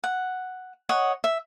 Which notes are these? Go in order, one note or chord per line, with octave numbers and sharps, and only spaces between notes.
F#5
C#5 D#5 F#5
E5